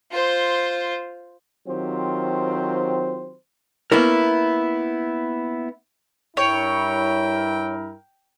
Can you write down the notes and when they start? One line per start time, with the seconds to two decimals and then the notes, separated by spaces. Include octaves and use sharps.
0.11 F4 C5
1.67 D#3 F#3 C4 F4 G4 C5
3.92 A#3 B3 C#4 E4 A#4
6.37 G2 E4 A#4 C#5 G5